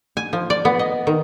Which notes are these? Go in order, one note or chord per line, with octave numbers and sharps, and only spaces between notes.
G#5
F3
D5
B3
D#5
D#3